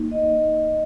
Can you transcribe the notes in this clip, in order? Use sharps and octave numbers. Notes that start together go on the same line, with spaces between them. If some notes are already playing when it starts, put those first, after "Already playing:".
Already playing: A#3 D#4
D#5